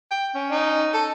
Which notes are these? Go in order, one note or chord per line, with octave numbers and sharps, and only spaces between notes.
G5
C#4
D#4
A4